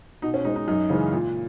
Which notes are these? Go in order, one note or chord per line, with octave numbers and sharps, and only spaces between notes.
B2 D#4
C#4
G#3 C#4 D#4
D#4
F#2 D#4
C#3 E3 G#3 C#4
A#2